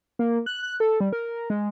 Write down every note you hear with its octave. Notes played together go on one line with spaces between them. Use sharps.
A#3
F#6
F#6
A4
G3
A#4
G#3